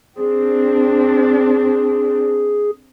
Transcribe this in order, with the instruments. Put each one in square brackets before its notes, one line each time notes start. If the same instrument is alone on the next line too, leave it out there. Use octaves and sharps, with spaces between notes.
[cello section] C4 D4 [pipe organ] G#4